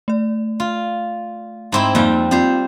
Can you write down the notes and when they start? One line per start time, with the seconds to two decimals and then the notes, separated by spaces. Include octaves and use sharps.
0.08 A3 D5
0.60 F4
1.72 G#2 C4 E4
1.95 F2 G3 A#3 D#4 G5
2.31 G3 C4 F4 C5